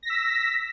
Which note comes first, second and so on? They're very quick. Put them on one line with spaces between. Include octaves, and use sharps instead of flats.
A#6 B6 E6